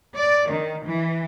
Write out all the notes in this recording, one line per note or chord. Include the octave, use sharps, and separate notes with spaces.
D5
D#3
E3